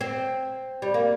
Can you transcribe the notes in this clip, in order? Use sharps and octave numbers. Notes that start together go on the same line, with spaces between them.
C4
G3
A#3